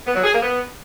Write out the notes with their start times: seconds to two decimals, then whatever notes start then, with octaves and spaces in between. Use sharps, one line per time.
0.06 B3
0.15 F#3
0.24 G#4
0.33 A#3
0.42 B3